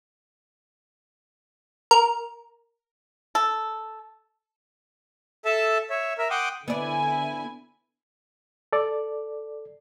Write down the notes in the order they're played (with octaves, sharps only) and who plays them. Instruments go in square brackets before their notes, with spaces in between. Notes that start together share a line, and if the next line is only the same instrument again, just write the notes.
[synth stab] A#4
[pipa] A4
[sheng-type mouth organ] A4 E5 A5
C#5 E5
A#4 E5
F#5 G5 C6 D6 D#6
[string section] D3 E4 G#5 [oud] B3 D5
[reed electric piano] A4 D5